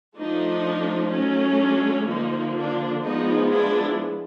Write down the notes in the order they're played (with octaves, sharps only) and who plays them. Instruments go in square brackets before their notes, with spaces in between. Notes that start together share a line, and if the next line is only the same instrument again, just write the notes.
[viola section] F3 A3 D4 D#4
F#3 A3 C#4
D4
D3 F3 A#3 D#4
D4
F3 G#3 B3 D4 D#4
D4 E4